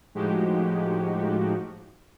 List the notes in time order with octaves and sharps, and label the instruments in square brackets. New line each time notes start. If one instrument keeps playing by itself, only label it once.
[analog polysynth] A2 F3 G#3 D#4 F#4 G4